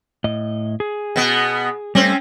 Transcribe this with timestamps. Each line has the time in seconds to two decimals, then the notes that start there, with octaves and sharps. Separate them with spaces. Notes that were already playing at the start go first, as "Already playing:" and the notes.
0.24 A2 D#5
0.80 G#4
1.16 B2 B3
1.95 G3 A3 C4 C#4 C5